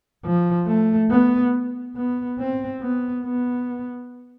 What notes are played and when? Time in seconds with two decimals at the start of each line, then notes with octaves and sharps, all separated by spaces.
0.25 F3
0.67 A3
1.10 B3
1.96 B3
2.39 C4
2.81 B3
3.24 B3